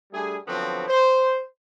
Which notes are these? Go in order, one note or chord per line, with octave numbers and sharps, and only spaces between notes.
G3 A3 D4 G#4
D3 F3 F#3 B3 C4 F#4
C5